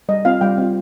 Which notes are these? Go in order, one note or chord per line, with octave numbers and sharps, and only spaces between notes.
G3 D#5
C4 F4 F5
G3 G5
C4 F4